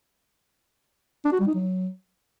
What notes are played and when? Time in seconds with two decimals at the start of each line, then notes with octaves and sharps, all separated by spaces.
1.25 D4
1.32 F#4
1.40 G3
1.47 D#4
1.54 F#3